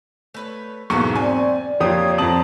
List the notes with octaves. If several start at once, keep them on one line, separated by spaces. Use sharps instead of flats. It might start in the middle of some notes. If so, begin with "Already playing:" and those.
A3 B4 C#5
B1 E2 G#2 A#3 F#4 G#4 A4 C#6
C4 D5 G#5
F2 A#3 F4 G4 C#5 D#6
F2 C4 D5 A5 A#5 D#6 F#7